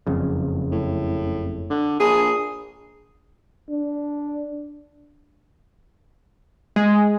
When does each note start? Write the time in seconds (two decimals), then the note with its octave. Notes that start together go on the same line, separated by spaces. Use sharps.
0.07 F#1 F2 C#3
0.72 A2
1.70 D3
2.00 A#1 G#4
3.70 D4
6.76 G#3